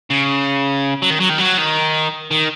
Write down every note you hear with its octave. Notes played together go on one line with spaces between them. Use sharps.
C#3
F#3
D#3
F#3
D#3
F#3
D#3
D#3